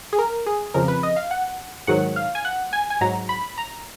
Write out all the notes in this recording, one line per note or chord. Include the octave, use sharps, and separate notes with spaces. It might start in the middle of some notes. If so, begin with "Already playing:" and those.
G#4
A#4
G#4
F2 C#3 F3 A#4
B4
D#5
F5
F#5
G#2 D#3 F#3 F#5
F5
G#5
F#5
G#5
G#5
G#2 F#3 A#5
B5
A#5